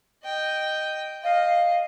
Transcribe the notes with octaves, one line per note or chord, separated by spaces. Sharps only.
D#5 G5
D#5 F5